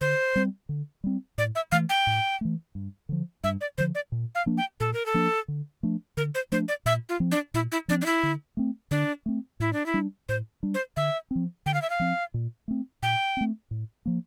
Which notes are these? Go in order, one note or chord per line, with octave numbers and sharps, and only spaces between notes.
D3 C5
G3 C4
D3
G3 C4
A2 D5
E5
E3 A3 F5
G5
A2
E3 A3
G2
D3 F3
G2 E5
D5
D3 F3 C5
D5
A#2
F5
F3 A#3 D4
G5
A#2 A4
A#4
A4
F3 A#3 D4
D3
F3 A3 D4
D3 A#4
C5
F3 A3 D4 C5
D5
A#2 E5
F4
F3 C4
D4
A#2 E4
E4
F3 C4 D4
D4
E4
D3
A3 C4
D3 D4
A3 C4
A2 E4
D4
E4
G3 D4
A2 C5
G3 D4
C5
D3 E5
F3 C4
D3 G5
F5
E5
F5
F3 C4
A#2
A3 C4
A#2 G5
A3 C4
A2
F3 A#3